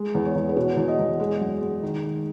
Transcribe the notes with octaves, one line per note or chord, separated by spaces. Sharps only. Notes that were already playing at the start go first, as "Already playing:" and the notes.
Already playing: G#3
E2
C#5
E2
B4
B2 C#5
E2
D#5
E2
G#3
F#2
G#3
D#3
D#3